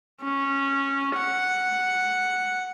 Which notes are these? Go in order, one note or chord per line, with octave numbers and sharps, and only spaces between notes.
C#4
F#5